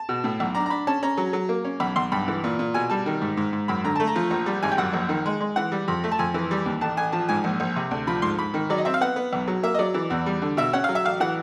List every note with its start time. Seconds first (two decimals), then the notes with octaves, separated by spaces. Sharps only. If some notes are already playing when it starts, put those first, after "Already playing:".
Already playing: A5
0.09 B2
0.24 A2
0.40 B1
0.55 D4 A#5
0.66 A#5
0.70 D4 B5
0.87 C#4 A5
1.03 C#4 A#5
1.17 F#3
1.33 F#3
1.49 A#3
1.65 C#4
1.80 B1 B5
1.96 B1 C6
2.12 G2 B5
2.28 E3
2.44 A#2
2.59 A#2
2.74 B2 G#5
2.90 G3 A5
3.06 D#3
3.21 G#2
3.37 G#2
3.53 G#2
3.68 F#2 B5
3.84 D3 A#5
3.96 A3 A5
4.07 A#5
4.16 F3
4.30 A#1 A#5
4.46 G3
4.63 G#1 G#5
4.72 G5
4.78 F#2 F#5
4.93 A#1
5.09 D#3
5.26 G#3
5.40 G#3
5.56 E3 F#5
5.72 G3
5.88 F2
6.04 A3
6.11 A5
6.19 F2 G#5
6.34 E3
6.51 G3
6.66 D#2
6.81 A1 A5
6.97 A1 G#5
7.12 F3 A5
7.29 G#2 G#5
7.44 A#1
7.60 A#1
7.76 C3
7.91 D2
8.07 F3 B5
8.22 G#2 C6
8.39 G#2 B5
8.54 D#3
8.70 F#3 D5
8.78 D#5
8.85 C4 E5
8.94 F5
9.01 B3 F#5
9.16 B3
9.33 B1
9.48 F#3
9.63 A#3 E5
9.74 D#5
9.79 F#3 D5
9.94 E3
10.10 E2
10.26 G3
10.42 D3
10.57 B2 E5
10.73 C#4 F#5
10.84 F#3 F5
10.95 E5
11.05 A1 F5
11.20 E3 F#5